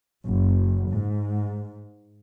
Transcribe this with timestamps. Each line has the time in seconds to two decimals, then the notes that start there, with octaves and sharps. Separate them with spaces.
0.25 F#1
0.91 G#2